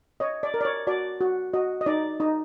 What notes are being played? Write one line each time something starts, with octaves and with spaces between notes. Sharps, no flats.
C#5 D#5
D5
A#4
D5
C#5
F#4 D5
F#4
F#4 D#5
D#5
D#4 D5
D#4 D#5